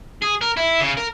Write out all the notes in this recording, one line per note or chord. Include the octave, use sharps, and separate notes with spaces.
G#4
A#4
E4
C#3
A#4